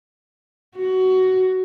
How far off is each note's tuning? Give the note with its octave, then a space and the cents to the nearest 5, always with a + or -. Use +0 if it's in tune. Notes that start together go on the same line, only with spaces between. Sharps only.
F#4 +15